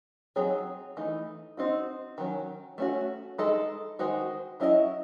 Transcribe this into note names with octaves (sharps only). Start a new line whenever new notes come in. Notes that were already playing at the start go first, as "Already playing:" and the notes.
F#3 C4 D#4 G#4 C#5
E3 A3 D#4
C4 D#4 F#4
D#3 F#3 C#4
A3 C#4 F#4
G#3 D#4 A4 D#5
D#3 G#3 D#4 F#4 C5
F#3 C#4 E4 A4 D#5